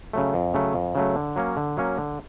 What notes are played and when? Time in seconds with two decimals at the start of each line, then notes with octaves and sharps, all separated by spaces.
0.13 C#3 F#3 A3
0.34 F2
0.54 C#3 F#3 A3
0.74 F2
0.95 C#3 F#3 A3
1.16 D3
1.36 F#3 A#3 C#4
1.57 D3
1.77 F#3 A#3 C#4
1.98 D3